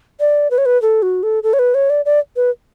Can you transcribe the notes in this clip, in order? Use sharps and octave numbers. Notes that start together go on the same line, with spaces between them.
D5
B4
C#5
B4
A4
F#4
A4
A4
C#5
B4
C#5
D5
D5
B4